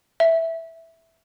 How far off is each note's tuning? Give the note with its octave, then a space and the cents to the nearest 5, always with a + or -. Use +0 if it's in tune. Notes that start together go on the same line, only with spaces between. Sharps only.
E5 -5